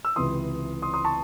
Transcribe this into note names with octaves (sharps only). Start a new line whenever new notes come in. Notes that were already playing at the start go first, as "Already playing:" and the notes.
E6
C#2 C3 E3 C6 D#6
C6 D#6
C6 D#6
A5 C#6